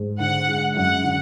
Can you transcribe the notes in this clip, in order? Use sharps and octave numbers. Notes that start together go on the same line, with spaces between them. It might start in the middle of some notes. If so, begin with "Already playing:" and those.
Already playing: G#2
D3 F#5
G#3
F#2 F#5
D3